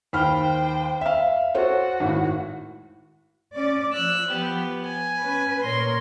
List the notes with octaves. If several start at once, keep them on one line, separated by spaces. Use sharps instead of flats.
D#2 C5 G5 B5 F6
E5 F5
F#4 A4 C5 C#5
G#1 A2
C#4 D5
F3 E6 F#6
B3 G4
G#5
C#4 B4
A#2 A#4 C#5 C6